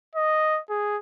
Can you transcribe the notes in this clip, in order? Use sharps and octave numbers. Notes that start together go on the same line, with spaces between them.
D#5
G#4